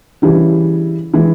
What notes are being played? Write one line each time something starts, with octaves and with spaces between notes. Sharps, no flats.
C#3 E3 G3
E3 G#3